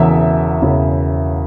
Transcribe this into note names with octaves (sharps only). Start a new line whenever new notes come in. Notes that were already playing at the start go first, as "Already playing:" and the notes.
Already playing: E1 E2 C#3 E5
E1 E2 C#3